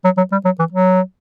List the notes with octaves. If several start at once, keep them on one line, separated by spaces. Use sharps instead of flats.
F#3
F#3
G3
F#3
E3
F#3